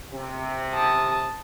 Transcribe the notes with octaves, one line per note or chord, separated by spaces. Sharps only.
C3
A5 D#6